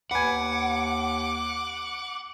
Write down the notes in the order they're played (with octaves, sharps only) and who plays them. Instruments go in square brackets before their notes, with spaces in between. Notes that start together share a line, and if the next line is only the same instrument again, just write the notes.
[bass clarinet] D#2 [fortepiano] B4 G#5 [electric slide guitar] F#5 [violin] D6